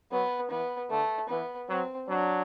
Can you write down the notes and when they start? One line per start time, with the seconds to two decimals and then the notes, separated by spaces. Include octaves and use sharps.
0.12 F#3 B3
0.50 E3 B3
0.90 D3 A3
1.29 E3 B3
1.69 F#3 C4
2.09 F#3 D4